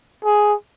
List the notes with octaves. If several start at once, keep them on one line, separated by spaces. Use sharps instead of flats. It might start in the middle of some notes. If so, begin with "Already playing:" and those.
G#4